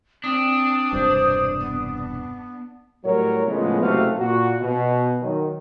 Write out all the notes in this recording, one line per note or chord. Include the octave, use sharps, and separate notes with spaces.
C4 D4 D#6
E1 G2 C3 C5
B3
A2 F#3 G3 A#4 C#5
A2 C#3 F3 G#3 B3
F#1 C3 F#3 A3 F#4 F5
A#2 F#4
B2
D#3 F#3